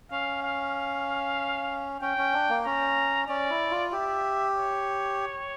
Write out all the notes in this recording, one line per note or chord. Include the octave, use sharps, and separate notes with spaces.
C#4 F5
F5
C#4 G5
C#4
D4
A#3
C#4 A#5
C#4 D5
E4
F4
G4 E5
C#5